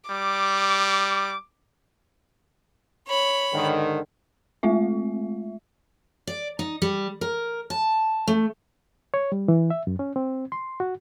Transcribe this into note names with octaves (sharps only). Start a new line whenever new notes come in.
G3 D6
C#5 B5
G#2 D3 D#3
G#3 A3 C4 F4 E5
D5
D#4
G3
A#4
A5
A3
C#5
G3
E3
E5
F#2
C#4
C4
C6
F#4